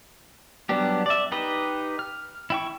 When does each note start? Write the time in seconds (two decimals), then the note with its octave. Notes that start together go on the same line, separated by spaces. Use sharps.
0.69 F#3 G3 B3 D4 G4
1.06 D5 E5
1.32 D#4 G4 B4 D#5
1.99 F6
2.50 E4 G5 C#6